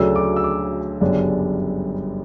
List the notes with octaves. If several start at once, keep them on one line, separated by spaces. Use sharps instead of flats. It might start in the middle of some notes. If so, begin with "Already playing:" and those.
Already playing: D2 C#3 F#3 A3 D4 E6
D6
E6
D6
G1 F#2 C#3 G3 D4